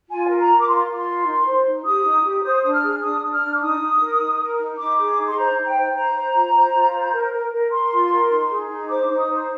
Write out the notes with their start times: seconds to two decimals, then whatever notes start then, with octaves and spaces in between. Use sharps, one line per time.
0.08 F4 G#5
0.28 A#4
0.38 A#5
0.48 A#4
0.60 D6
0.67 F4 C6
0.86 F4
0.96 C6
1.06 A#4
1.25 D#4
1.45 C5
1.65 D#4
1.84 G4 D#6
2.04 D#4
2.23 G4
2.43 C5 D#6
2.62 D4 D#6
2.72 F6
2.82 G#4
3.01 D4 D#6
3.21 D4
3.32 F6
3.40 D4
3.55 D6
3.60 D#4 D#6
3.80 D#4
3.99 A#4
4.18 D#4
4.38 A#4
4.58 D#4
4.78 D#4 D6
4.97 G#4
5.16 D#4
5.27 C6
5.36 C5 A#5
5.56 D#4
5.65 G5
5.75 C5
5.95 C5 A#5
6.14 C5
6.34 F4
6.53 C5
6.73 F4
6.92 C5
7.13 A#4
7.32 A#4
7.52 A#4
7.71 A#4 C6
7.90 F4
8.10 A#4
8.29 D#4
8.49 G#4
8.68 D#4
8.88 C5 D6
9.08 D#4
9.17 D#6
9.27 C5